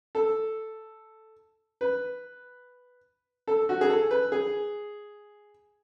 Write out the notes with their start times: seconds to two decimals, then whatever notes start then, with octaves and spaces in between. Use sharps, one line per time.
0.15 A4
1.81 B4
3.48 A4
3.69 F#4
3.81 G#4
3.89 A4
4.11 B4
4.32 G#4